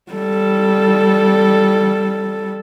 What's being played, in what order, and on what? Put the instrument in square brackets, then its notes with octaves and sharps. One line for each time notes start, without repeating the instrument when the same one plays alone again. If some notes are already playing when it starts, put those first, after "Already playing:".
[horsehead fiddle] G3 A4